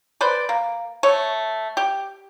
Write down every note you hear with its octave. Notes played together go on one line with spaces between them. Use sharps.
B4 C5 D5
A#3
A3 C#5
G4